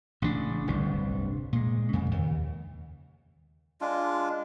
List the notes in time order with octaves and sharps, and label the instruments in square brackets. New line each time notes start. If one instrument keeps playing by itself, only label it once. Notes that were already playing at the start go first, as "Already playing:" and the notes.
[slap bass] A1 C#3 E3 D4
D1 G1 C2 D4
A#2 G#3
F2 C#3
D#2
[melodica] G#3 D4 F4